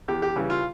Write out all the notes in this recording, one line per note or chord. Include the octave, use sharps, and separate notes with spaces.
E2 G4
G4
C#3 E3 G3
F4